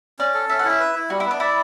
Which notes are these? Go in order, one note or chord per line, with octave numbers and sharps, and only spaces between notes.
C#4 D5
A4
C#4 E5
F#5
E4
E5
B4
E4
G3 F#4
E4
B3
D4
E4 D5